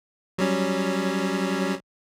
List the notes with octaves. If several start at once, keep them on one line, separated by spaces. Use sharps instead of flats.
F#3 G3 C#4